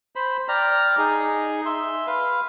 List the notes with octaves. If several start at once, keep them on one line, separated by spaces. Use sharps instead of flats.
C5 B5
D5 G5 A#5 F6
D#4 G#4
E5 C6
B4 F5